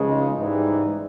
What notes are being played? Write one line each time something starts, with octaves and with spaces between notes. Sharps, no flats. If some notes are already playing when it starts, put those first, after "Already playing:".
Already playing: C#2 C#3 F3 G#3
D#4
G#2 E3 G3 D#4